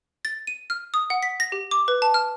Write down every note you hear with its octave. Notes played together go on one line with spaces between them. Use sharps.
A6
D#7
F6
D#6
F#5
B6
A#6
G4
D6
B4
A5
F6